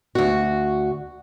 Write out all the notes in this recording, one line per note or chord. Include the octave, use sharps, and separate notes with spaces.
D2 F#4